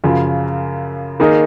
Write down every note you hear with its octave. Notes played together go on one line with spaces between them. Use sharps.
F#2 C#3 F3
D#3 A#3 D#4 G#4